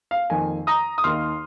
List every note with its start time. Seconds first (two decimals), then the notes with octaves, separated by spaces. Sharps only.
0.11 F5
0.30 F2 D#3 A#3 G#5
0.67 A#5 D#6
0.98 D#6
1.04 D#2 D#3 A#3 D#4 C6 F6